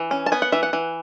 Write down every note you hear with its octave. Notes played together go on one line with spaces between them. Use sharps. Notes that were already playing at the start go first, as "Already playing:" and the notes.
Already playing: E3
C#4
A5
B3 G#5
F#5
E3 E5
F#5
E3